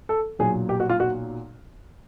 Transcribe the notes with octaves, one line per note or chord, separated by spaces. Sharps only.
A4
B1 A#2 F#3 G#4
G4
F#4
F4
F#4